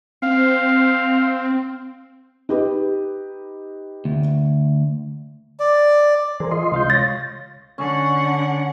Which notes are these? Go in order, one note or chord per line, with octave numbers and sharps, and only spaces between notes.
C4 F5
D#4 G4 B4
D2
D5
E3 G#4 A#4 C5
F4 D#5 C6
C#2 C3 G#3 F5 G6
C#5 A6 A#6
D3 C#4 F#5